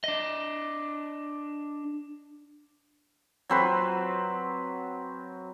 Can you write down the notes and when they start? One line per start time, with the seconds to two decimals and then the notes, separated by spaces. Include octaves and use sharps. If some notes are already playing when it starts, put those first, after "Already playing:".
0.04 D4 D#5
3.49 F#3 C4 B4